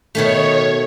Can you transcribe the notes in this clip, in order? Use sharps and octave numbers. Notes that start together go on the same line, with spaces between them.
B2 D#3 A3 C#5